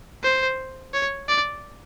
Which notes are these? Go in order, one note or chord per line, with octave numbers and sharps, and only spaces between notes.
C5
C#5
D5